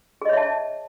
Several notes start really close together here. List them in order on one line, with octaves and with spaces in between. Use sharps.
G#4 D#5 C#5 E5 A5